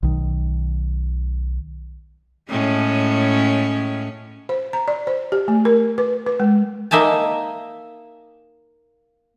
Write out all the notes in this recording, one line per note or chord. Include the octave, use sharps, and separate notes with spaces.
B1 D#3
A2 G#3 C#4
C5
A#5
D5
C5
G4
A3
A#4
B4
B4
G#3
A#3 D#4 E5 G#5 A5